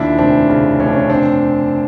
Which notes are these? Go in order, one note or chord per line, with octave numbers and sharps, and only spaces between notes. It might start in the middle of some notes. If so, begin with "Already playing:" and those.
Already playing: D#2 A#2 D4 E4
F1 C4 D4
C#3
F1 C#4
D4
C#4
C4 D4